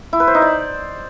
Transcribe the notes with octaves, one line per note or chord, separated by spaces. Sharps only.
E4
B4
C5
D#4
D5